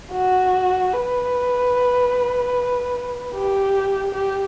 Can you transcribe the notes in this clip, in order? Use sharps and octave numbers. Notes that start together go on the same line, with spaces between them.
F#4
B4
G4
G4